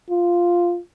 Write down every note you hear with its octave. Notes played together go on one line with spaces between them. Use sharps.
F4